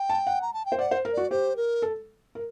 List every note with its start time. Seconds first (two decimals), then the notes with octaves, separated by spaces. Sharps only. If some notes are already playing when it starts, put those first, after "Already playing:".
Already playing: G5
0.09 A5
0.27 F#5
0.42 A#5
0.54 A5
0.66 G5
0.72 C5
0.79 D5 F#5
0.91 C5
1.05 A#4
1.13 F#4 D5
1.30 G4 C5
1.56 A#4
1.82 A4
2.35 A#4